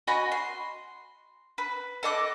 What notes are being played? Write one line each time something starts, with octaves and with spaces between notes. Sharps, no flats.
F#4 D#5 G#5 B5
C6
B4
A4 D#5 D6 F#6